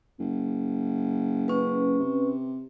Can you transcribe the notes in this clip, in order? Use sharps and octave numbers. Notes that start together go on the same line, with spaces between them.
F#1
C#4 B4
C3